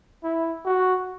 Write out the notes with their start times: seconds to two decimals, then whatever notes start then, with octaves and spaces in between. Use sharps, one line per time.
0.24 E4
0.65 F#4